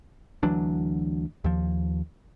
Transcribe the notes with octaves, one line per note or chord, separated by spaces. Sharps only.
D2 E3 F#3 D4
D#2 F3